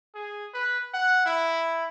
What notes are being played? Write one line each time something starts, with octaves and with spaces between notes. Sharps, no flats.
G#4
B4
F#5
E4